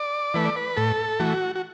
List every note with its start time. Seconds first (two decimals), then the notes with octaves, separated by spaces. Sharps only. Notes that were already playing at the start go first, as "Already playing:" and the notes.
Already playing: D5
0.34 E3 A3 B4
0.45 D5
0.56 B4
0.77 A2 A4
1.20 E3 A3 F#4
1.56 F#4